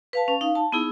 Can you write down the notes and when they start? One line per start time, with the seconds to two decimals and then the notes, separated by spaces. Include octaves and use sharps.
0.13 B4 F5 A5
0.28 C#4
0.41 D#4 F5
0.55 A5
0.72 B3 D#4 E4 G#4